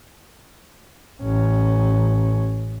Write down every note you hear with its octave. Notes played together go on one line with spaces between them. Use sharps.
A1 C#4